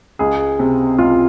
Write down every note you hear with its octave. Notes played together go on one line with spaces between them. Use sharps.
C#2 G#4
C3
C#2 F4